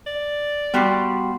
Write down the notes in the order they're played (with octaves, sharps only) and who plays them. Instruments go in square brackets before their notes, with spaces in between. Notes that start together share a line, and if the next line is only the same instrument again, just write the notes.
[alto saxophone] D5
[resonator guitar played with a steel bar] G3 F#4 G4 [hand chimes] B3 C6 C7